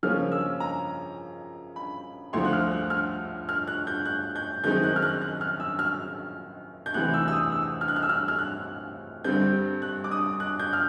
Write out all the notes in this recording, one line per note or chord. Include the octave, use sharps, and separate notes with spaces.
C#3 F3 A#3 C#4 F6
E6
A#5
B5
D2 D3 F3 C6
F#6
F6
F#6
F6
F6
F#6
G6
F#6
G6
F#2 D#3 G#3 C4 D#4 G6
F#6
F6
F#6
F#6
F6
E6
F6
G6
D2 C3 E3 F#6
E6
E6
D#6
E6
F6
F#6
F6
E6
F6
F6
F#6
G2 D3 G3 C4 G6
F#6
D6
D#6
F#6
G6
F6